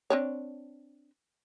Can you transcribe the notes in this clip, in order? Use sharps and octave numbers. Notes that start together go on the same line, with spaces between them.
C4 D4 C#5